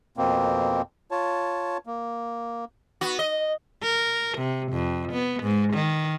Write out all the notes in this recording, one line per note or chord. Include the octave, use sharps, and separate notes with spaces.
F2 B2 A#3 C4
F4 C#5 A5
A#3
B3 F#4
D#5
A#4
C3
F2
B3
G#2
D#3